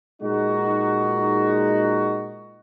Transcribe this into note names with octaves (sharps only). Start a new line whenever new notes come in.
A#2 G#3 D#4 F#4